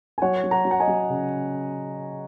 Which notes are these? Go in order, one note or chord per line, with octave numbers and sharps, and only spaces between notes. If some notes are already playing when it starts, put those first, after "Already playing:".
G#5
F#3 C#5 F#5
F#3
F#5 A#5
F#3
F#5
D#5 G#5
F#3
C#3